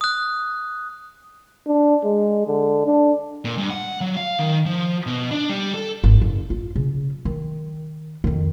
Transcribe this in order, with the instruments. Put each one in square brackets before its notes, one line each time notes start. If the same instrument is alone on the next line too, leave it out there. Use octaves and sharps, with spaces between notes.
[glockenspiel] D#6 F#6
[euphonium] D4
G#3
D3
D4
[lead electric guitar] A#2
G2
F#5
F#3
F5
D#3
F3
B2
D4
G3
A4
[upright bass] G#1
F#1
F4
C#3
D#3
F2 D#3